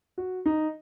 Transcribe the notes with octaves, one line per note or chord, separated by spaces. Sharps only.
F#4
D#4